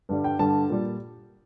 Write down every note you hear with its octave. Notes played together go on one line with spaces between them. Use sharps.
G2 D3 G3
G5
G2 D3 G3 A5
A#2 G3